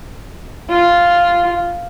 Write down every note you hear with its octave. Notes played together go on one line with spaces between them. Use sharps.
F4